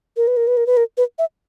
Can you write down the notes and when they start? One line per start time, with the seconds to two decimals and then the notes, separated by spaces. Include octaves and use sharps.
0.17 A#4
0.27 B4
0.37 A#4
0.47 B4
0.57 A#4
0.66 B4
0.77 A#4
0.97 B4
1.18 E5